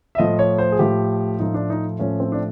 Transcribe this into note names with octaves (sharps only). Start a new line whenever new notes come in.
E5
A2 F3 A3 D#5
C#5
C5
G#4
A2 F3 A3 G4
A2 F3 A3 D#4
D4
D#4
A2 F3 A3 C#4
C4
D4